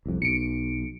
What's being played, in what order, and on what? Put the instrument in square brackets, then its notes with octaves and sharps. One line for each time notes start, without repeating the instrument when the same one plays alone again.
[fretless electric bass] C2 F2
[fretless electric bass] B1 [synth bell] C#7 D7